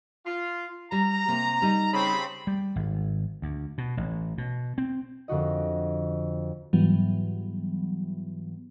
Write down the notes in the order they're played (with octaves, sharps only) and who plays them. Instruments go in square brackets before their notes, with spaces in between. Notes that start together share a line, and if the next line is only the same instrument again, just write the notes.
[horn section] F4
[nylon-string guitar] G3 [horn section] A#5
[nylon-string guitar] C3 A#3
G3 D#4
[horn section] C#3 C4 B5
[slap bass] G3
G#1
D2
B2
A1
B2
C4
[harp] F2 D3 F#4 D#5
[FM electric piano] G#2 E3 F#3 G3 B3